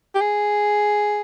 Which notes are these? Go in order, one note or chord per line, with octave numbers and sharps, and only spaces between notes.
G4
G#4